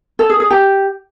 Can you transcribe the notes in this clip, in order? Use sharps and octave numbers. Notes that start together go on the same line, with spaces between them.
A4
G#4
G#4
G4